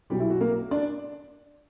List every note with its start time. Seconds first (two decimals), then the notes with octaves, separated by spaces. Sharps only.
0.10 B1 B2 F#3 G3 G4
0.20 E4
0.30 F#4
0.41 A#3 A#4
0.71 D4 D5